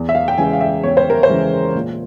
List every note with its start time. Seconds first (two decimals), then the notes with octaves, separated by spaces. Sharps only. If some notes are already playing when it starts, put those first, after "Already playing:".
Already playing: E2
0.09 E5
0.15 F5
0.28 G5
0.38 C#3 E3 G#3 G#5
0.53 F5
0.61 E5
0.84 E2 C#5
0.97 C5
1.10 A#4
1.23 C5
1.29 C#3 E3 G#3
1.75 A#2